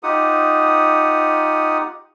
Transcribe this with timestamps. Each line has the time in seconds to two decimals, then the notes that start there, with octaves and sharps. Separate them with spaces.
0.03 D#4 F4 G4 F#5 D#6